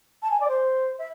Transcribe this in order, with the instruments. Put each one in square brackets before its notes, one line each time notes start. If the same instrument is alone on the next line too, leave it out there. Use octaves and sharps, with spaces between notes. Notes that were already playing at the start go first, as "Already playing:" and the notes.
[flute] A5
G#5
D5
C5
E5